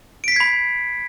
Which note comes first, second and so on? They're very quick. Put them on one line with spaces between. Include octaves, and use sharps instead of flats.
D7 B6 C7 G#6 B5